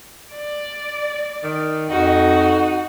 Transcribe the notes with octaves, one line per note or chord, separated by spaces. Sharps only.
D5
D#3
F2 D#4 F#4